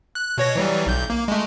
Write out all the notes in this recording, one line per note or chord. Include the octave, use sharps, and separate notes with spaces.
F#6
B2 C#5 A#6
E3 F#3 G3
B1 G6
A#3
G#3 A3